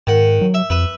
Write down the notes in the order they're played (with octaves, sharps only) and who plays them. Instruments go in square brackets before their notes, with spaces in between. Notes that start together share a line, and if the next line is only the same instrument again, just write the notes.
[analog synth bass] G#2 [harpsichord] D#3 F#5
[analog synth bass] F#3
[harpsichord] E5
[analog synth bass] F2 [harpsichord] B4 E5